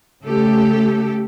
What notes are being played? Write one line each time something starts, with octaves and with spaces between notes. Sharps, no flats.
C#3 A3 G4 A4